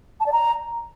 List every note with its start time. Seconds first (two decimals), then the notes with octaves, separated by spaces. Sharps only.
0.20 A5
0.26 D5
0.32 A#5